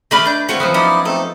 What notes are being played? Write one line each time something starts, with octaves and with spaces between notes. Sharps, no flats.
A3 B4 D5 D#5 B5 F6
D4 G6
A3 C4 F#4 C#5 F5
F3 F#3 B3
C#4 D#4 E4 D5
A3 C4 D#4 A4